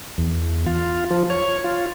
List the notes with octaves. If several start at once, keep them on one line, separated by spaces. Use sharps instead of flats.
E2
F4
F3
C#5
F4